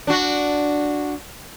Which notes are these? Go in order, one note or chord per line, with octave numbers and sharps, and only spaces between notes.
D4 F#4